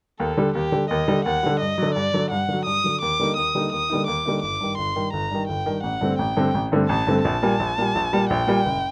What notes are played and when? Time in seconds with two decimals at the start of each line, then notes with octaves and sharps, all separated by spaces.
0.20 D#2 A4
0.37 D3 G3
0.55 D#2 G4
0.72 D3 G3
0.90 D#2 D#5
1.08 D3 G3
1.25 D#2 F#5
1.43 D3 G3
1.60 G2 D#5
1.78 D3 F#3
1.95 G2 D5
2.14 D3 F#3
2.31 G2 F#5
2.48 D3 F#3
2.66 G2 D#6
2.84 D3 F#3
3.02 D#2 D6
3.19 D3 G3 A#3 D#4
3.37 D#2 D#6
3.55 D3 G3 A#3 D#4
3.72 D#2 D#6
3.90 D3 G3 A#3 D#4
4.07 D#2 D6
4.25 D3 G3 A#3 D#4
4.42 G1 D6
4.61 G2 D#3
4.78 G1 C6
4.96 G2 D#3
5.13 G1 A#5
5.31 G2 D#3
5.48 G1 G5
5.66 G2 D#3
5.83 A1 F#5
6.01 G2 D3 A3 C4
6.19 A1 G5
6.36 G2 D3 A3 C4
6.54 A1
6.72 G2 D3 A3 C4
6.89 A1 A5
7.07 G2 D3 A3 C4
7.24 A#1 A5
7.42 A#2 G3
7.59 A#1
7.78 A#2 G3
7.95 A#1
8.13 A#2 G3
8.30 A#1 G5
8.47 A#2 G3
8.66 F#1